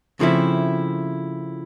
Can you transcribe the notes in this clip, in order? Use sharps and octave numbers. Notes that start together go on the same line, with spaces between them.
C#3 F3 A3 C4 E4